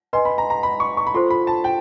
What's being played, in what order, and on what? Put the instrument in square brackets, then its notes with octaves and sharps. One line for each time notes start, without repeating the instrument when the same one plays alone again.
[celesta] B4 D#5 G#5 [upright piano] C6
[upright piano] B5
A#5
A#5
B5
C#6
C#6
B5
[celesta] F4 A4 C5 [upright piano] C6
[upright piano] B5
A5
G5